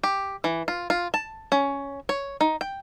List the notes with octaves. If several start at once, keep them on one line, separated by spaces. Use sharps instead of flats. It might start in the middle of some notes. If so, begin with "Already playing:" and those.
G4
E3
F4
F4
A5
C#4
C#5
D#4
G5